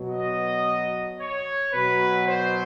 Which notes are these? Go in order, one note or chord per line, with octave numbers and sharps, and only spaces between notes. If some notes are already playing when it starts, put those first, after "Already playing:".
Already playing: B2 F#3
D#5
C#5
B2 F#3 B4
C5